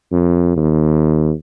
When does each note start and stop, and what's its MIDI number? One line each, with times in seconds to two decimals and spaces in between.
0.12 0.56 41
0.56 1.31 39